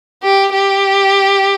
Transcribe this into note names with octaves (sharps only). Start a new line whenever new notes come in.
G4
G4